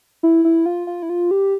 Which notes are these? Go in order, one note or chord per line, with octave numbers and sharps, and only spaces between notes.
E4
E4
F4
F4
E4
F4
G4